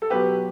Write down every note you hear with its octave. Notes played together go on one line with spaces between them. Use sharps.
A4
B2 F#3 B3 G4 B4